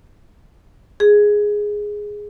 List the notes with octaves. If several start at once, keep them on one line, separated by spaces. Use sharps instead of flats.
G#4